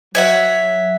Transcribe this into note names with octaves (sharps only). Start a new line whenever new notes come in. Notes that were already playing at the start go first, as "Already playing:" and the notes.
F#3 C#5 E5 F#5